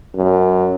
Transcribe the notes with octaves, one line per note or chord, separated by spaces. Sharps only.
F#2